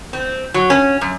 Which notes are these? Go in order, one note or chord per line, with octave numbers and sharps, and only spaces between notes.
C4
F#3
C#4
F#2